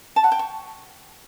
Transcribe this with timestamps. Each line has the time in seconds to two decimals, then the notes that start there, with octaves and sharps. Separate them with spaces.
0.16 A5
0.24 F#5
0.32 G5
0.39 C#6